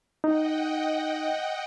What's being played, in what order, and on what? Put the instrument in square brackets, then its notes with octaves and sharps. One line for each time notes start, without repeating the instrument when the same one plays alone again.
[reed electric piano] D#4 [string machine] D#5 F#5 G5